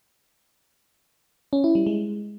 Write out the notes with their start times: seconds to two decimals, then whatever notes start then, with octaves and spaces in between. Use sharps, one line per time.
1.53 C#4
1.64 E4
1.75 G3
1.86 G#3